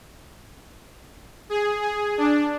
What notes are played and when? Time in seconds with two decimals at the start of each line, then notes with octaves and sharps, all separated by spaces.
1.50 G#4
1.82 G#4
2.18 D4